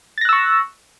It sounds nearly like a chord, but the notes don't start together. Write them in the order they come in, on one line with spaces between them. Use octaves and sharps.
A6 A#6 F#6 E6 C#6